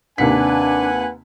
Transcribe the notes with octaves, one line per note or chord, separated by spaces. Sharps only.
D#2 C3 D4 B4 F#5 G#5 B6